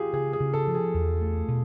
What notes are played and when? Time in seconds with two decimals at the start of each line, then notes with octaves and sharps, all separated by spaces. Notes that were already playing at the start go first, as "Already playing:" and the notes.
Already playing: F4 G4 G#4
0.13 C#3 G#4
0.33 G#4
0.40 C#3
0.54 A4
0.67 F3
0.75 G#4
0.94 E2
1.21 A3
1.48 B2